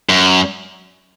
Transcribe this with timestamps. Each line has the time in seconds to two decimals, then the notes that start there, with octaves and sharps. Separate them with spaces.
0.09 F#2